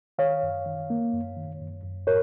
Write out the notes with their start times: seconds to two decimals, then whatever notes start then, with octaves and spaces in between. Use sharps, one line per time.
0.18 D#3 C#5 F5
0.43 F#2
0.66 D#3
0.90 A#3
1.13 F#2
1.37 D#3
1.60 F#2
1.84 F#2
2.07 A2 A#4 C#5